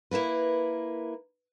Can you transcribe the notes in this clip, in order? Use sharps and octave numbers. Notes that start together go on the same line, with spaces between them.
A#3 E4 A#4 B4